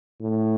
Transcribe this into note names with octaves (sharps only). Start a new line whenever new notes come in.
A2